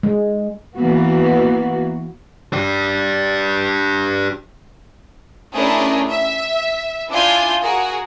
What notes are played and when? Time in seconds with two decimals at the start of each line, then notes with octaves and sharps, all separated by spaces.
0.03 G#3
0.76 E3 A#3 B3 F#4
2.53 D4 G4
5.53 A3 C#4 D4 E4 G#4 A#4
6.08 E5
7.09 D4 E4 F4 D5 G#5 G6
7.61 F#4 G#4 A#4